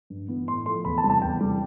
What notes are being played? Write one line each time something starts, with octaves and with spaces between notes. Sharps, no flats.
G2
E3 B3
A2 C6
F3 A3 C6
E2 B5
A5
C3 G3
A5
E2 G5
C3 G3